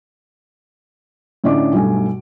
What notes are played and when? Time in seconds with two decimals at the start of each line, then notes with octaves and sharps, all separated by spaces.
1.44 A2 D3 C#4 D5 D#5 D6
1.72 B1 G2 G3 A3 G#5